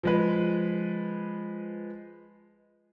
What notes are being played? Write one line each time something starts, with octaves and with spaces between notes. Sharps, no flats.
F3 G#3 B4